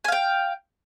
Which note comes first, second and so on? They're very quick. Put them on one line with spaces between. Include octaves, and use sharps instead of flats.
G#5 F5 G5